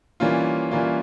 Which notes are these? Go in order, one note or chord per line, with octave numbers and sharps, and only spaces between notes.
E3 G3 A#3 C#4 F4
E3 G3 A#3 C#4 F4